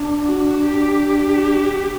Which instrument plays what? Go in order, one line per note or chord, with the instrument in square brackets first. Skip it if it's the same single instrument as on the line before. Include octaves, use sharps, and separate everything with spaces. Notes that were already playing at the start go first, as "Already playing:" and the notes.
Already playing: [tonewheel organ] D4
[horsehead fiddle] F#4
G4